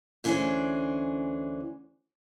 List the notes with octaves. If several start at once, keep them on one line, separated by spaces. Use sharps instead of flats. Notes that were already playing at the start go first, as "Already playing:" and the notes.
D2 E3 C#4 D4 G#4 C5